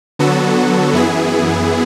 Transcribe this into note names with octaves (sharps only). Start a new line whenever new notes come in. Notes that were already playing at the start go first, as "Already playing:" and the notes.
D3 F#3 B3 F#4 A4
F#2 E3 B3 E4 G#4